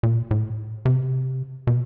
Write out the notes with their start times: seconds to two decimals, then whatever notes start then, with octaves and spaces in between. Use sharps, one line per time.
0.03 A#2
0.31 A2
0.85 C3
1.67 B2